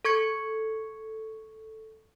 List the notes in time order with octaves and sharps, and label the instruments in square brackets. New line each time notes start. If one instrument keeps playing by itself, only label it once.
[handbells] A4 C#6 G#6 C#7